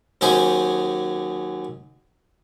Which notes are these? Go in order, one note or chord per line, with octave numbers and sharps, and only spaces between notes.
D#2 F#3 C#4 G#4 C5 D6